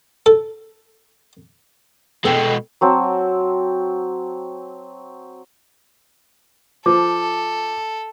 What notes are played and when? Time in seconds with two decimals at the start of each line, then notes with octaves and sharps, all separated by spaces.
0.26 A4
2.25 B2 G#3 A4 F#5 G5
2.81 F#3 C4 A5 E6
6.86 F3 A4 D6